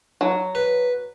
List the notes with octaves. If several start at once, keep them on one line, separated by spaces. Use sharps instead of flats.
F#3
B4